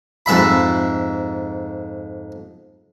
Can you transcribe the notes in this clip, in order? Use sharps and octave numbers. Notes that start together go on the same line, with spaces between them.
F2 G#2 E5 B5